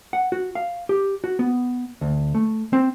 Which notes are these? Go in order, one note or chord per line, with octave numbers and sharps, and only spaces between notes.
F#5
F#4
F5
G4
F#4
B3
D2
A3
C4